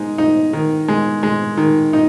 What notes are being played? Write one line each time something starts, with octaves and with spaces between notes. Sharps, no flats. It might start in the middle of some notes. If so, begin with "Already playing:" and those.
Already playing: G#3 D#4
D#4
D#3
G#3
G#3
D#3
D#4